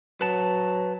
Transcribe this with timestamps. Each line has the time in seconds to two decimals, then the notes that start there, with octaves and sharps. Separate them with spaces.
0.21 F#3 B4 A5